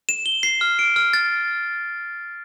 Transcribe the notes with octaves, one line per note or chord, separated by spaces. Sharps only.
E7
G7
C7
F6
D7
F6
A6